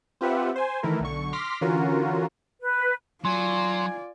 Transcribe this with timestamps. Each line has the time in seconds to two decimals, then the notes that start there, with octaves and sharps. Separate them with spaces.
0.21 C4 F4 G4 B4 E5 F#5
0.56 C5 G#5
0.83 D#3 E3 A3 E4 A#4
1.00 B1 D3 C#6
1.33 C6 D6 F6 A#6 B6
1.61 D3 E3 C#4 F4 F#4 A#4
2.60 B4
3.25 F#3 F4 D5 G#5 C6